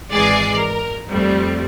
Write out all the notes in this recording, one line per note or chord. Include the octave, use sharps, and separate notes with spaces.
G#1 E3 G#3 G#4 D5 C7
A#4
F2 G3 A3 C4